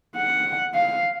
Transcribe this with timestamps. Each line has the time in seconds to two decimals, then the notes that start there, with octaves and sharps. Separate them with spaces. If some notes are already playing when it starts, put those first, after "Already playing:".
0.16 F#5
0.74 F5